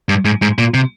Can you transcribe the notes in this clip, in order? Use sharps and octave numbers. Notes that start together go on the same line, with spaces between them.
G2
G#2
G#2
A#2
C3